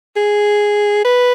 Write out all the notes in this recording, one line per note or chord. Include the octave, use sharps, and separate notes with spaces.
G#4
B4